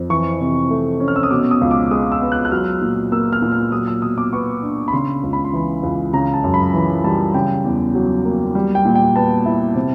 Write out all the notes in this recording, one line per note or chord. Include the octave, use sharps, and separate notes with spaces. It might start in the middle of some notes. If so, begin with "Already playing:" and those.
Already playing: F2
E3 C#6
C3
A3
C#4
F6
E6
D#6
B2 D6
D#6
C#2
D6
G#3 D#6
E6
B3
F#6
F#6
F#3 F6
A#2
A#3 E6
F6
A#2
F6
F#3 D#6
E6
B2 D#6
D6
B3 C#6
D4
B5
C#3 C6
C#2
B5
C6
E3 B5
C#2
C#3 A#5
A5
F#2
B5
E3
G3 A5
C#3 G5
E2
F#3
A#3
G3
G5
A#2
G5
B3 A5
E4
C3